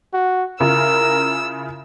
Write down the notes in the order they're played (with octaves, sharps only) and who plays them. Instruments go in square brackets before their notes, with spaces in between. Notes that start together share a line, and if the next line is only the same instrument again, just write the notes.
[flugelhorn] F#4
[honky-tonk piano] C#3 E4 F4 [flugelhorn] A#4 [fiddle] E6